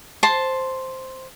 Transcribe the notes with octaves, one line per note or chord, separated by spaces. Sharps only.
C5 A5 C6